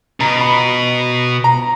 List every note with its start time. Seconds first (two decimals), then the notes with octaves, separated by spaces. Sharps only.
0.20 B2 A#5
0.31 A#5
0.41 B5
1.44 A#5